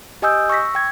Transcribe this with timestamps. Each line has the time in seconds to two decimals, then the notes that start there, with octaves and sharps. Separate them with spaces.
0.22 G4 D#5 G#5 D#6 E6 G6
0.49 C#6 E6 A#6 B6
0.75 G5 G#6